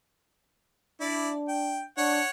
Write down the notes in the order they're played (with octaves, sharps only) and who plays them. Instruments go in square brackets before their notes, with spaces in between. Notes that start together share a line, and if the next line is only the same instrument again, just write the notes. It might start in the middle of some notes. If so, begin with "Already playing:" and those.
[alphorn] D4 [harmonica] E4 D5
[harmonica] G5
[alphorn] D4 [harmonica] C#5 F#5